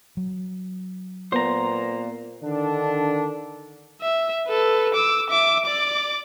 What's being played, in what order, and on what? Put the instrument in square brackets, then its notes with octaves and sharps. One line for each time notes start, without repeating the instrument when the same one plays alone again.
[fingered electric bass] F#3
[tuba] A#2 [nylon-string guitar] B3 [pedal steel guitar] C5 A#5
[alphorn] D3 [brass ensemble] D#3 D4
[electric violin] E5
A4 B4
D6 E6
E5 D6
D5 D6